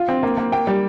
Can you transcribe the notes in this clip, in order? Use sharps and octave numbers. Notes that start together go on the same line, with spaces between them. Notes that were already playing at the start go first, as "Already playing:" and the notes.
Already playing: F4
C4
A#3
A#3
A#3 G5
G3